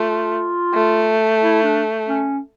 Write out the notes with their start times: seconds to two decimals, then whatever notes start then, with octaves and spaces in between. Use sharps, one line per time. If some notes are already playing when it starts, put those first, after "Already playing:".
Already playing: A3 F4
0.74 A3
1.41 E4
1.63 D4
2.08 C#4